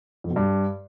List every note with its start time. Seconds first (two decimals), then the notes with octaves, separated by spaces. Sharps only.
0.24 F2
0.30 B2
0.36 G2